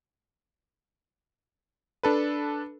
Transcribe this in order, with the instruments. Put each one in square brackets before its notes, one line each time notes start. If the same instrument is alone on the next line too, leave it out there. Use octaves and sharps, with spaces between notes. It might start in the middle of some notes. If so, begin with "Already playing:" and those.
[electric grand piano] D4 A4 B4